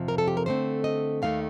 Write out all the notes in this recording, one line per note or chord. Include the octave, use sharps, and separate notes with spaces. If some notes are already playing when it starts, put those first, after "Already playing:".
Already playing: F2 C3 F3
A#4
A4
G4
A#4
D3 A3 C4 C5
D#5
D#2 D#3 A3 F5